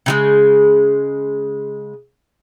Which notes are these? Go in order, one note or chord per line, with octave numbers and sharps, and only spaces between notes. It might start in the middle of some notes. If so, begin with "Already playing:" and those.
C#3 G3 G#3